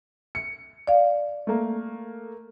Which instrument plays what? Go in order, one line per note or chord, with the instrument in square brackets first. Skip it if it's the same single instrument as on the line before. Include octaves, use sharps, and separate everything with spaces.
[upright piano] C#7
[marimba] D5 F5
[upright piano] A3 A#3